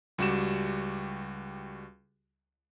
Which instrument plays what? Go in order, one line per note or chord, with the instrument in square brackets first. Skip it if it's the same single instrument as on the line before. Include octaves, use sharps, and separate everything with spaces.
[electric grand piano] C#2 G3 F#4 G4 E7